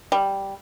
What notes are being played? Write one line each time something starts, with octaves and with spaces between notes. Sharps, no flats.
G3